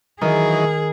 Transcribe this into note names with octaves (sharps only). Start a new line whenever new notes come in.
D#3 E3 F#3 D#4 G#4